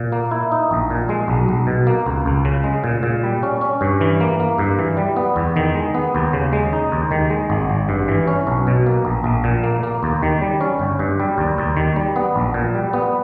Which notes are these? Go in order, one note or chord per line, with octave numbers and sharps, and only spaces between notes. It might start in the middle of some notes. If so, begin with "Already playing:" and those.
Already playing: A#2
A#3
E4
D#4
A#1
A#2
G#3
B1
B1
B2
A#3
C#2
C#2
C#3
G#3
A#2
A#2
G3
C#4
C#4
G2
E3
A#3
A#3
G2
E3
G3
B3
E2
D#3
G#3
B3
D#2
C#3
G#3
D#4
D#2
D#3
G#3
G#1
G#1
G2
E3
C#4
B1
B2
A#3
A#1
A#1
A#2
A#3
A#3
D#2
D#3
G3
C#4
G1
G2
G3
D#2
D#2
D#3
G3
B3
A#1
A#2
G3
B3